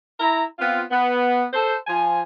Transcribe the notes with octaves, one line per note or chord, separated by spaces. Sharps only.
E4 A#5
B3 C4 F4
B3
A4 C5
F3 G#5